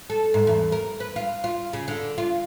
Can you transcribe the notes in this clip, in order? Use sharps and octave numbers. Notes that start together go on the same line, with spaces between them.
A4
G#2
E2
A#4
B4
F4
F4
C#3
D3
F4